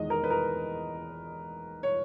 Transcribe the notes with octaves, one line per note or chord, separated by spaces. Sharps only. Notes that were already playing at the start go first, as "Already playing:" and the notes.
Already playing: E2 D#3 G#3 D#5
A#4
B4
A#4
C#5